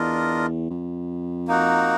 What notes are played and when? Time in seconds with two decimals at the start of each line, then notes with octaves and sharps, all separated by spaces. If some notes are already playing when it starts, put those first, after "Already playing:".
Already playing: E2 D4 F4 A#4 D#5
0.70 F2
1.48 A#3 D#4 F#4